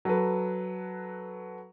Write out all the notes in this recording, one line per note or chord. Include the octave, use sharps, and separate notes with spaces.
F#3 A4 B4